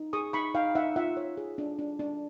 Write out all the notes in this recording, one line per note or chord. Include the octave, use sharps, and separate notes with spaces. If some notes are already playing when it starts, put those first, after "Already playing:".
Already playing: D#4
G#4 C#6 D#6
D#4 B5 C#6
D#4 F5 G5
D#4 E5 F#5
F4 E5 F#5
C#5
G#4
D4
D4
D4